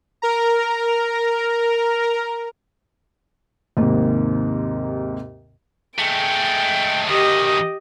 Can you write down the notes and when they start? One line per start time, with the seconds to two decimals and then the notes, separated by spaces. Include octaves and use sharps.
0.22 A#4 A#5
3.77 D#2 G#2 C3 A#3
5.99 G#3 A3 G5
7.07 D2 D#3 G4 D#5